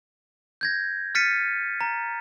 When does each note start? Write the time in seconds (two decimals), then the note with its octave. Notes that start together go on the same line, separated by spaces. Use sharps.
0.61 G6 G#6 A#6
1.15 F6 A6 B6 C#7 D#7
1.81 A#5